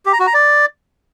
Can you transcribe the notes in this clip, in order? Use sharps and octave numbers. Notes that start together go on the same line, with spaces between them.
G4
A#5
F#4
A#5
D5